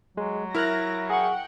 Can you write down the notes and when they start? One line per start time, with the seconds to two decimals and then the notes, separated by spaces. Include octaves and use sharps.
0.17 F#3 G#3
0.55 E4 A#4 E5 F6 F#6 A#6
1.10 G#4 F#5 G5 C#6